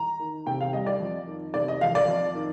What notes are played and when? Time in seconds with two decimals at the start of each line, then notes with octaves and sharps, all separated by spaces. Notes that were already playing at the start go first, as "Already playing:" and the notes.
Already playing: A#5
0.20 D#3
0.46 C3 G5
0.61 F5
0.73 G3 D#5
0.86 D5
1.00 F2
1.27 D#3
1.54 C3 D5
1.68 D#5
1.81 F2 F5
1.95 D5
2.08 F2
2.35 D#3